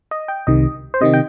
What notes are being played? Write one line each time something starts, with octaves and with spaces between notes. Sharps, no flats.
D#5
G5
C2 C3 D#3 D#5
C5
C3 D#3 C4 D#5
G5